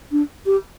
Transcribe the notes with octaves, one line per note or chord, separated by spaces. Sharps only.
D4
G4